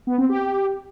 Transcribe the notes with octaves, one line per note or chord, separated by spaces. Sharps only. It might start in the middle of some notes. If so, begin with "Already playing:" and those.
B3
C4
G4